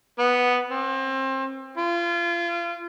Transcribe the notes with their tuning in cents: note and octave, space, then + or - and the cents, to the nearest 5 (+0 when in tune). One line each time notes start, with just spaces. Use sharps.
B3 +0
C4 +30
F4 -30